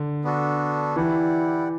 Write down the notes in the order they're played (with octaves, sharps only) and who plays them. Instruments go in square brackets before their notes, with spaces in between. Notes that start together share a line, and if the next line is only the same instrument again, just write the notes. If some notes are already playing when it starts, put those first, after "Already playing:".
Already playing: [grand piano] D3
[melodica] B3 D4 F#4 A4
[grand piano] E3 [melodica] E4 G4 D5 F#5